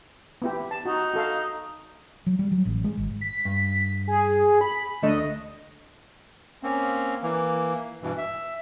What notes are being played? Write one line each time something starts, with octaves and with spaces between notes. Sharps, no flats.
B3 E4 G4
A5
D#4 F#4
F#4 A4 F5
F#3
G3
F#3
A1
G#3
G#1
B6
G2
G#4
B5
D2 A3 D4 D#5
A#3 C4 C#4
E3 A#3
G2 B2 E3
E5